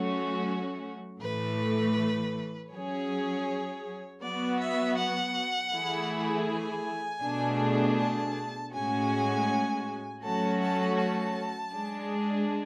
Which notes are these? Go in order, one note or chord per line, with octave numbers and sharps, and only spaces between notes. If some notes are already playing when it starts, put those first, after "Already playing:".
Already playing: F#3 A3 C#4 F#4
A2 E3 A3 B4
F#3 C#4 G#4 C#5
F#3 B3 F#4 D5
E5
F#5
E3 A3 E4 G#4
G#5
B2 A3 D4 G#4
A5
A2 G#3 C#4 F#4 G#5
F#3 A3 C#4 F#4 A4 A5
A5
A5
G#3 D4 G#4